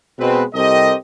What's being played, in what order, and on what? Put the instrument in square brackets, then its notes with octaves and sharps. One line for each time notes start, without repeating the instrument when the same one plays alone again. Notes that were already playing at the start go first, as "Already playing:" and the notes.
[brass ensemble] B2 G#3 C4 B4
C2 C4 G4 A4 A#4 D#5